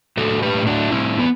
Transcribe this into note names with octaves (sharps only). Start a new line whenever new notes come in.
A2 F#4 A4
G4 B4
A2
D4 F#4
A2 C4 E4
B3